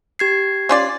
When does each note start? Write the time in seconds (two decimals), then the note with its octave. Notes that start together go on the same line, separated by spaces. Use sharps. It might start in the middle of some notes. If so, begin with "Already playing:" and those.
0.19 G4 G#6 C7
0.69 C#4 F4 D5